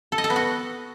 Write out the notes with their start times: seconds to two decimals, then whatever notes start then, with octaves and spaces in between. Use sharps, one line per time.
0.12 A4
0.18 D#5
0.24 A4
0.30 B3
0.36 F#4